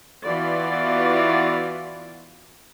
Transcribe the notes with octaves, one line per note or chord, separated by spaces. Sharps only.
E3 B3 F4 F#4 D5